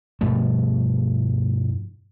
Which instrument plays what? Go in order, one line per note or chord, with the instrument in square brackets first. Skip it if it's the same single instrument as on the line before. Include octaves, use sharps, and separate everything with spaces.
[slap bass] G2 B2 F3 A3